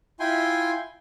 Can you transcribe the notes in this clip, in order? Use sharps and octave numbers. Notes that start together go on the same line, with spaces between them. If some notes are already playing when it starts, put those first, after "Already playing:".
E4 F4 G5 G#5 C6